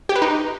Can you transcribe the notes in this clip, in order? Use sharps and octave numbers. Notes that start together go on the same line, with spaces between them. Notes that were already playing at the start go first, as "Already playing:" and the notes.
G4
B4
D#4